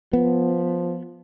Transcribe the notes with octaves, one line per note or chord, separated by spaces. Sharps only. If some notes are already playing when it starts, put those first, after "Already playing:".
F3 B3